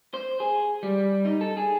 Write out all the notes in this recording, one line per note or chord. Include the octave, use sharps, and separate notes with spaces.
C5
G#4
G3
D#4
A4
G#4